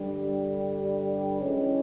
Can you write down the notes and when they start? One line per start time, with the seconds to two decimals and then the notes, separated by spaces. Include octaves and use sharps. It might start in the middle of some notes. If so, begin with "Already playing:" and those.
Already playing: G2 D3 G3
1.41 E3 G#3 C#4